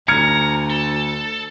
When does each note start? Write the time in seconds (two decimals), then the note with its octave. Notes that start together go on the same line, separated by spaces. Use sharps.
0.08 D2 A#5 F6 G#6 C#7
0.70 A4